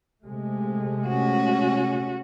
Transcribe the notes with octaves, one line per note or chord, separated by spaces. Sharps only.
C3 G#3 A3
C#4 F#4